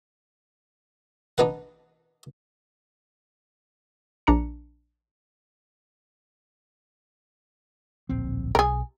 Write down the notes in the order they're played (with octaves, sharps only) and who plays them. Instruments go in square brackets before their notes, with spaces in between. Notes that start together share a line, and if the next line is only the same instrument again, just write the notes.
[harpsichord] D4 D#4 B4 F#5
[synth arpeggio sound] A#1 D4 A#5 C#7
[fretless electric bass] D1 A#1 C4
[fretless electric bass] B1 [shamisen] G#4 A#4